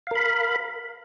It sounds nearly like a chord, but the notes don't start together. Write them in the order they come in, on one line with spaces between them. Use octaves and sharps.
F5 A#4 B5